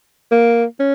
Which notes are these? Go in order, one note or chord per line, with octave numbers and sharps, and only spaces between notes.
A#3
C#4